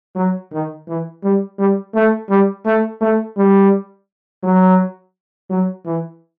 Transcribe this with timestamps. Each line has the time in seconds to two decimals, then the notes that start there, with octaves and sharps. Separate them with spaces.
0.15 F#3
0.52 D#3
0.87 E3
1.23 G3
1.58 G3
1.94 A3
2.29 G3
2.65 A3
3.01 A3
3.36 G3
4.43 F#3
5.50 F#3
5.86 E3